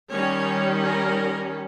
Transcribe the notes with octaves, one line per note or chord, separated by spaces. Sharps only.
D#3 G3 C#4 C#5
A#4